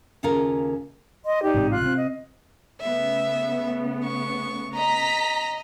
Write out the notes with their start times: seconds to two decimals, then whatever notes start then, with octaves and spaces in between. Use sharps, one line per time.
0.23 D#2 C#3 F4 A4 A#4
1.25 D#5 C6
1.42 D#4 G4 D5
1.54 A1 G#2 C3
1.70 F4 F#6
1.82 C3 C4
1.95 D#5
2.80 C#3 A3 B3 E5
4.05 C#6
4.75 D#5 A#5 B6